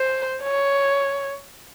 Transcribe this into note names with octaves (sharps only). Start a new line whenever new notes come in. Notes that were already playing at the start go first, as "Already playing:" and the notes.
Already playing: C5
C#5